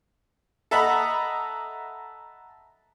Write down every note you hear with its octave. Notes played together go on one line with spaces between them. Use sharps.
A4 D#5 E5 F#5 A#5 B5